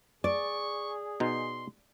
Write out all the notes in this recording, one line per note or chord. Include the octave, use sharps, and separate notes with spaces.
G#4 D5 C#6
B2 D#4 C6